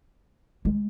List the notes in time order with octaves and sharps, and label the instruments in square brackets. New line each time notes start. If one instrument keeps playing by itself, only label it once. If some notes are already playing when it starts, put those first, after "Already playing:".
[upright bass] G#3